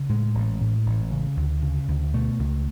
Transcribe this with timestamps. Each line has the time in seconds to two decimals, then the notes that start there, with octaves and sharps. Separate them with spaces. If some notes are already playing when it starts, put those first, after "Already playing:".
Already playing: C#3
0.09 A2 G#3
0.35 A1
0.61 A2
0.86 A1
1.11 C#3
1.37 D2
1.62 C#3
1.88 D2
2.14 B2 A3
2.39 C#2